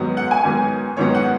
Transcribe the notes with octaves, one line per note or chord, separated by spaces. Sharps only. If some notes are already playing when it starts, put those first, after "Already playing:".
Already playing: G#2 D#3 F#3 B3
F#5
G#5
G#2 D#3 F#3 B3
G#2 D#3 F#3 B3 C#5
F#5